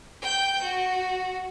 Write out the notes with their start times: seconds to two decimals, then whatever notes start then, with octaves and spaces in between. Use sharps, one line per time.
0.22 G5 G6
0.62 F#4